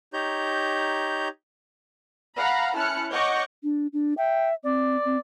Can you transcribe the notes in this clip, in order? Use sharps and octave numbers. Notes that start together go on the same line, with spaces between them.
D#4 G4 C#5 A#5 G6
F5 F#5 A#5 B5
C#4 E4 A5 F6 F#6 C#7
C#5 D#5 F#5 C#6 D6 G6
D4
D4
E5 G5
C4 D5
C4